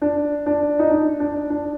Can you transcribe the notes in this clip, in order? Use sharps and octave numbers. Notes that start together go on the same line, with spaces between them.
D4
D4
D#4
D4
D4
D4